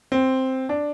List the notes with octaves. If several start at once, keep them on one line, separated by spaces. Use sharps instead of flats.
C4
D4